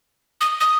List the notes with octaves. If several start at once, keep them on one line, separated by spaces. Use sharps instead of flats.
D#6
D#6